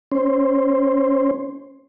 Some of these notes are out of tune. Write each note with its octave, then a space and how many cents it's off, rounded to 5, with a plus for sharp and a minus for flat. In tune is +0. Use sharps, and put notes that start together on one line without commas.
C#4 +0 C5 +0